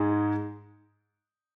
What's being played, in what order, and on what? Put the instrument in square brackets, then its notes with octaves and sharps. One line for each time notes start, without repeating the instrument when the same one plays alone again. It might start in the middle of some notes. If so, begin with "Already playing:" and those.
Already playing: [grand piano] G#2 G#3